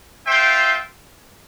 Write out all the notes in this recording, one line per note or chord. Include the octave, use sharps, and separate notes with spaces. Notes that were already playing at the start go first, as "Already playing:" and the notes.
F4 C5 E5 G5